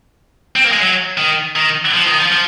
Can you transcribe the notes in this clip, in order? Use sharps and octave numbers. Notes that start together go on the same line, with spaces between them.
C4
A#3
G#3
F#3
D#3
D#3
F3
D#3
F3
F3